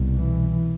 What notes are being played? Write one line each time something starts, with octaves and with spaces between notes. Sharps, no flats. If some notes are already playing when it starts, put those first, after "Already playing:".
Already playing: C2 B2
E3